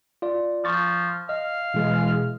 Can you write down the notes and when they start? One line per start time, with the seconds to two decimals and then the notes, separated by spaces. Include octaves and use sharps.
0.22 F4 D5
0.65 F3 C#6 A6
1.29 D#5 F5
1.74 B2 E3 G#3